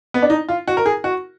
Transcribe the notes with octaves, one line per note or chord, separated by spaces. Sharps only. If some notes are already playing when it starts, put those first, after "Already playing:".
B3
D4
D#4
F4
F#4
A#4
G#4
F#4